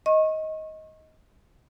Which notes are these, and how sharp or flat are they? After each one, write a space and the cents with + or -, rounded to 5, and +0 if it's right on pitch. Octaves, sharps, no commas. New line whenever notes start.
D#5 +15 C#6 -35